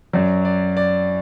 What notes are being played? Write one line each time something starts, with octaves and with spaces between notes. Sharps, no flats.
F#2 F#3 D5
D5
D5